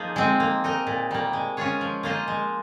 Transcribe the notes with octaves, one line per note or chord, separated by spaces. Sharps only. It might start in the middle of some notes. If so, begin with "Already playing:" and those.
Already playing: F3 A#3 D#4 G#4
G#3 C4
A#3
D#4 A#4 D#5
A#2
G3 A#3
G#3
C#4 F4 G#4 C#5
F3
A#3 F4 C5 D#5
G#3